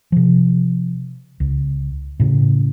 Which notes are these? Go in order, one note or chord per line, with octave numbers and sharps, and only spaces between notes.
C3 F3
C#2
A2 C#3